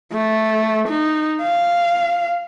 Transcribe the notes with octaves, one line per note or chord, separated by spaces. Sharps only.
A3
D#4
F5